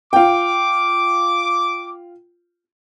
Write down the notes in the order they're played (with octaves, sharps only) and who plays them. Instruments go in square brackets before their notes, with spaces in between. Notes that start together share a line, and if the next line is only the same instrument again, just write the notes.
[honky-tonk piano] F4 G5 [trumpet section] D6